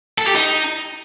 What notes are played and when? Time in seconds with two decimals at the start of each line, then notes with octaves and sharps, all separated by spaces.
0.18 A4
0.27 G4
0.35 D#4